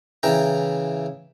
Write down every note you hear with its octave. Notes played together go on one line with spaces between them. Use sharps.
C#3 E3 E4 G5 A#5